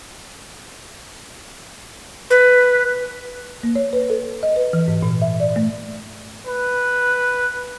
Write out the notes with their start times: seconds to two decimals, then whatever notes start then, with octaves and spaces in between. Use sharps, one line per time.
2.30 B4
3.63 A#3
3.75 C#5
3.93 B4
4.10 A4
4.43 D#5
4.56 B4
4.73 E3
4.88 G#2
5.03 A#2
5.22 E5
5.40 D5
5.56 A3
6.47 B4